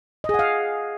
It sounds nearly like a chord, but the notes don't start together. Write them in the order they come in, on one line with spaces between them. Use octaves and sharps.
D#5 G#4 F#5 F5